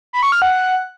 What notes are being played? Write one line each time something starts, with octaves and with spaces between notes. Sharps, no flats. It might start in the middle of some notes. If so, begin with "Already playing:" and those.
B5
C#6
F6
F#5